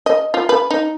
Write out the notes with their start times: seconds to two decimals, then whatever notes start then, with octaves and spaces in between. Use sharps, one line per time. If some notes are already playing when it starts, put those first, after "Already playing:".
0.06 D#5
0.34 F4
0.49 B4
0.71 D#4